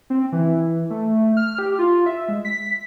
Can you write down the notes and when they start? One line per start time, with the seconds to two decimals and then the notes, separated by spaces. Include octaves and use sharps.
0.10 C4
0.32 E3
0.56 E3
0.90 A3
1.37 F6
1.59 G4
1.79 F4
2.06 E5
2.28 G#3
2.45 B6